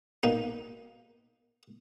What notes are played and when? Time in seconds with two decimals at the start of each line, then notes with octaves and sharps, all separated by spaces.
0.23 B2 A#3 D#4